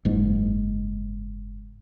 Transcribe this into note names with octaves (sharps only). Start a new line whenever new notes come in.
F#1 G#2